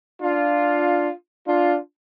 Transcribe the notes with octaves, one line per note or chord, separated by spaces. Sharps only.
D4 F4
D4 F4